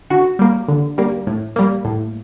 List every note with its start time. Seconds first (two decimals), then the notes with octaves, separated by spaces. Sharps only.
0.10 D3 F#4
0.39 G3 A#3
0.68 D3
0.98 G3 A#3
1.27 A2
1.56 G3 A#3
1.85 A2